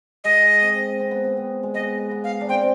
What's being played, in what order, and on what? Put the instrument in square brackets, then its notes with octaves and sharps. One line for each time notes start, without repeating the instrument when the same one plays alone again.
[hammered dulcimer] G#3 [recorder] D#5
[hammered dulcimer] C4
C4
B3
C4
B3
G#3
[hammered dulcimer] B3 [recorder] D#5
[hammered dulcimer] B3
[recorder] F5
[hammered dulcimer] D4
[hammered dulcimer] C4 [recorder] G5